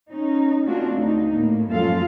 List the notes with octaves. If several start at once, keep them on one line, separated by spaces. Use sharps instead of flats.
C#4 D#4
G#3 A#3 C4 D4 F4 F#4
D2 D#4
A2 A#3
F#2 F3 G#3 F4 A4 F5